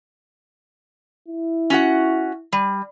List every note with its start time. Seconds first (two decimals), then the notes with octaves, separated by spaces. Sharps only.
1.28 E4
1.70 C#4 F#4 F#5
2.53 G3